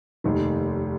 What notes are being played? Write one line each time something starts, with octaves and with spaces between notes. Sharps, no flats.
F1 D#2 D#3